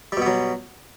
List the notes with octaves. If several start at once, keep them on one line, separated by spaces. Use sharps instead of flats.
B2 F#3 G3 B3